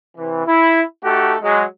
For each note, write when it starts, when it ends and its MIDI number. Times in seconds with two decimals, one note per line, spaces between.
0.17 0.44 48
0.17 0.44 52
0.46 0.81 64
1.03 1.35 57
1.03 1.35 63
1.03 1.35 66
1.03 1.35 67
1.03 1.35 69
1.42 1.64 54
1.42 1.64 56